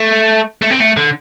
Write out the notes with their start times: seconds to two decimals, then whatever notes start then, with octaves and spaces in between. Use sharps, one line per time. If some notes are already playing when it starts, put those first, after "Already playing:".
Already playing: A3
0.62 A3
0.70 C4
0.80 A3
0.97 D3